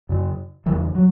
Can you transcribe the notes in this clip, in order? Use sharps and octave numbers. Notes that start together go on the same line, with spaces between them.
F#2 C#3
C#3 E3
E2
F#3